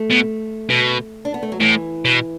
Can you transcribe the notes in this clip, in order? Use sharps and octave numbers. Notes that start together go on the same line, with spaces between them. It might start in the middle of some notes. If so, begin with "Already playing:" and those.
Already playing: A3
B2
B2
D4
B3
A3
F#3
A2 E3
B2